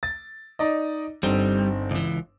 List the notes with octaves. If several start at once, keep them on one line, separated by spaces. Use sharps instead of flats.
A6
D#4 D5 D#5
G1 G3 C4 D#4
C#2 E3